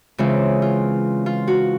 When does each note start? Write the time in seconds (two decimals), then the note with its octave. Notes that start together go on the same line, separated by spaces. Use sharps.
0.18 C#3 E3 G#3 C4 F4
0.62 F4
1.26 F4
1.47 F#4